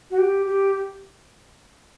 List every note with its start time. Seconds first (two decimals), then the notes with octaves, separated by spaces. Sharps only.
0.11 F#4
0.18 G4
0.46 G4